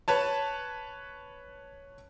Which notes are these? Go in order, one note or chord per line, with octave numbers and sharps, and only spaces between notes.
B4 C#5 A5